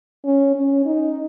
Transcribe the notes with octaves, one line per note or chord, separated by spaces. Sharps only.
C#4
C#4
D#4